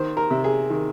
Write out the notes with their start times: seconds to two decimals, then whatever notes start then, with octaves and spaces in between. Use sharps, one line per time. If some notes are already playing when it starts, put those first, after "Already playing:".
Already playing: D#3 C5
0.17 A#4
0.31 C3
0.44 G#4
0.70 D#3